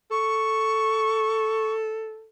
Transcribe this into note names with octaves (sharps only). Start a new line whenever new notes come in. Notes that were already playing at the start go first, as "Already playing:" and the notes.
A4 C#6